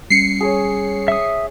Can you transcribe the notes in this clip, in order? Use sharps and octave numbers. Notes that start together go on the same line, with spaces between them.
G3 C#4 C7 C#7
G#4 C#5
E5 D#6